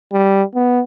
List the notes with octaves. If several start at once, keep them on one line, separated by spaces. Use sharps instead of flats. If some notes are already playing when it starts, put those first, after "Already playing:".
G3
B3